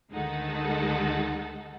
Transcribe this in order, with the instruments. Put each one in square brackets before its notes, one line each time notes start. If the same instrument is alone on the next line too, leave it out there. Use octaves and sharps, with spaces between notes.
[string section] D2 D#3 G#3 D#4 A4 F#5